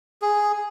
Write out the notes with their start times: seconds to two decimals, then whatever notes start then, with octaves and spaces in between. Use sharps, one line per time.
0.22 G#4